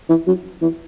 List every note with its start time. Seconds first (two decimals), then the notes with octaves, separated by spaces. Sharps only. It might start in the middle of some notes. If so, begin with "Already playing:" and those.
0.09 E3
0.27 F#3
0.62 E3